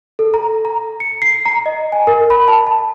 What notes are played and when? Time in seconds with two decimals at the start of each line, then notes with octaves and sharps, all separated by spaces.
0.19 A4
0.34 A#5
0.65 A#5
1.00 C#7
1.22 C7
1.46 A#5
1.66 D#5
1.92 G#5
2.07 A#4
2.30 B5
2.48 A5
2.67 A5